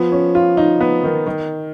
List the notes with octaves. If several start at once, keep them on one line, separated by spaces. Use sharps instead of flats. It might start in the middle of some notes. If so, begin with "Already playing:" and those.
Already playing: F3 B3
C#4
F4
D#4
B3
D#3
D#3